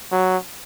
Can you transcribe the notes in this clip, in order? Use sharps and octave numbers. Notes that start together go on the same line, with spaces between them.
F#3